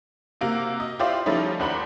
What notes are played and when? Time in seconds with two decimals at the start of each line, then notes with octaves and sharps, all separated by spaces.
0.41 C3 A#3 F#4
0.80 D#5
0.99 E4 F4 G4 C5 D5 F5
1.26 F3 G3 A3 C#4 D#4 E4
1.59 D#2 D4 C5 F#5 A#5 B5